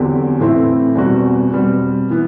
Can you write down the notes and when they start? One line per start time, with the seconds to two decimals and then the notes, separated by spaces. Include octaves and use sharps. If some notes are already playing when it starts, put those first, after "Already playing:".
Already playing: E2 D3 F#3 C4 G4
0.39 A2 E3 A3 C4 E4
0.95 E2 B2 G3 C4 F#4
1.51 B2 G3 C4
2.10 E3 B3